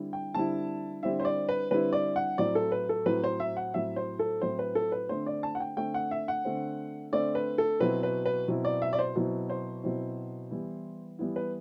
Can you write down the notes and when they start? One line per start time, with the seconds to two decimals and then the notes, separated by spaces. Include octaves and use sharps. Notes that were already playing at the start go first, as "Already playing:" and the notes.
Already playing: D3 G3 C4 E4
0.13 G5
0.34 D3 G3 C4 E4 A5
1.03 D3 G3 C4 E4 E5
1.20 C5
1.25 D5
1.49 B4
1.71 D3 G3 C4 E4 B4
1.93 D5
2.16 F#5
2.38 A2 F#3 C4 E4 D5
2.55 A4
2.72 B4
2.89 A4
3.06 A2 F#3 C4 E4 B4
3.24 C5
3.40 E5
3.57 F#5
3.74 A2 F#3 C4 E4 E5
3.96 C5
4.19 A4
4.41 A2 F#3 C4 E4 C5
4.59 B4
4.75 A4
4.92 B4
5.09 D3 A3 C4 C5
5.26 D5
5.43 A5
5.55 F#5
5.60 G5
5.77 D3 A3 C4 G5
5.94 F#5
6.11 E5
6.28 F#5
6.45 D3 A3 C4
7.12 D3 A3 C4 D5
7.35 B4
7.58 A4
7.80 B2 F#3 C4 E4 B4
8.03 B4
8.26 B4
8.48 B2 F#3 C4 E4
8.65 D5
8.82 E5
8.93 D5
8.99 C5
9.16 B2 F#3 C4 E4
9.50 C5
9.84 B2 F#3 C4 E4
10.51 E3 G3 B3 E4
11.19 E3 G3 B3 E4
11.36 B4